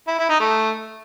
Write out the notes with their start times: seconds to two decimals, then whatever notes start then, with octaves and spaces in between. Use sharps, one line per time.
0.08 E4
0.18 E4
0.29 D#4
0.40 A3